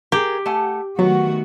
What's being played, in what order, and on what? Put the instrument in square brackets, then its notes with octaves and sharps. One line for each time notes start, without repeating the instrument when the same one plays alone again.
[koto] G4 [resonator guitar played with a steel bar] G#4 A#4
[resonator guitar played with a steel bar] A3 F#5 G#5
[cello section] D#3 A3 F#4 [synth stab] F#3 [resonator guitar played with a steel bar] B3